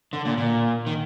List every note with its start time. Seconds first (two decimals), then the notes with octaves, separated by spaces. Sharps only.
0.13 D3
0.25 A#2
0.37 A#2
0.86 D#3